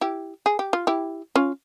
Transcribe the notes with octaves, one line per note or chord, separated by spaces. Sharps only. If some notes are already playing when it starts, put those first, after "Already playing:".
E4 G4
G#4
G4
F4
E4 G4
C#4 F4